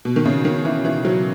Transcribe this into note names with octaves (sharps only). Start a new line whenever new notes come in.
B2
D#3
C#3
D#3
E3
E3
F#3